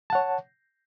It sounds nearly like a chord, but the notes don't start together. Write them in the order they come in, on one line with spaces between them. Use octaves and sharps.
A5 F#5 C#5